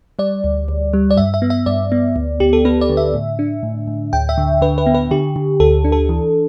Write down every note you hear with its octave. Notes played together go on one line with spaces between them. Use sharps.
G3 D5
D2
D2
G3
D5
G2 E5
E5
B3
E5
G2 D5
B3
D2
D2 G4
A4
B3 B4
D5
D3
E5
A2
D4
A2
A2
D2 G5
E5
D3
D3 B4
B4
B3
B4
D3 G4
D3
D2 A4
D4
A4
E3